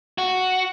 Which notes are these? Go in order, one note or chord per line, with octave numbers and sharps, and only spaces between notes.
F#4